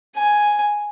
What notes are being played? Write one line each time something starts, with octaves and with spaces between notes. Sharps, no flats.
G#5